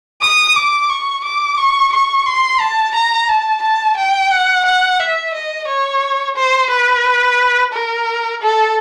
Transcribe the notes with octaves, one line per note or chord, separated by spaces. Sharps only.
D#6
D6
C#6
D6
C#6
C#6
C6
A5
A#5
A5
A5
G5
F#5
F#5
E5
D#5
C#5
C5
B4
A#4
A4